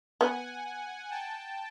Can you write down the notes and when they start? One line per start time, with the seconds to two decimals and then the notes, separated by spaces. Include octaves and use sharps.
0.21 B3 F#5 G#5
1.11 G5 A5